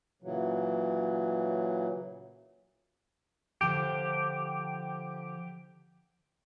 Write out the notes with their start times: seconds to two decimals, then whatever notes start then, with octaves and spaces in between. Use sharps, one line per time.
0.22 A#2 C#3 E3 F#3
3.61 D3 F3 G4 A5